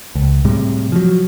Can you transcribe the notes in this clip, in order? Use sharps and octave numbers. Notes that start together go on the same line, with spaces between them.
C#2
A2 C3 G3 G#3
F3 F#3